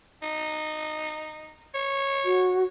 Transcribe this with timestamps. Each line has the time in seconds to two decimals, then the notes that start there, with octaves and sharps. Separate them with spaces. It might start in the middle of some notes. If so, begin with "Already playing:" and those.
0.22 D#4
1.75 C#5
2.25 F#4